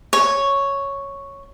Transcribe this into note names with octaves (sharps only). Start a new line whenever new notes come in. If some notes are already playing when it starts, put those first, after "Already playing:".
C#5